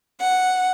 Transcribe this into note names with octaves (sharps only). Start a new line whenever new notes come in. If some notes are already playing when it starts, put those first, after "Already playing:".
F#5